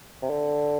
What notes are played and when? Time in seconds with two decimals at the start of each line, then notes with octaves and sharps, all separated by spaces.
0.22 C3
0.30 D3